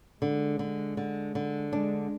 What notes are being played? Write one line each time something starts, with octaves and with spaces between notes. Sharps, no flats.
D3 G#3
D3
D3
D3
G#3 D4